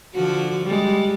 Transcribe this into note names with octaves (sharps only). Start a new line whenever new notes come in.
D3 F3 F#4
G3 G#3